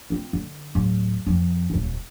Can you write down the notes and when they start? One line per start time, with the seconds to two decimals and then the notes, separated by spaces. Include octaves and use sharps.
0.10 C4 F4
0.33 D3
0.75 D1
1.26 F2
1.70 D#1 C#2